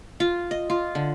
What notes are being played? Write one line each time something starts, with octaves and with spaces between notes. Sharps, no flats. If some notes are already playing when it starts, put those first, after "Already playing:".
F4
D#5
F4
D3